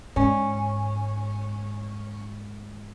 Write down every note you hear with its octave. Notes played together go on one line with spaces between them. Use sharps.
G#2 C#4